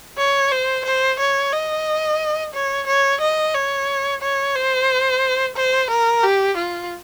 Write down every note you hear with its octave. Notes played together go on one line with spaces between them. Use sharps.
C#5
C5
C5
C#5
D#5
C#5
C#5
D#5
C#5
C#5
C5
C5
A#4
G4
F4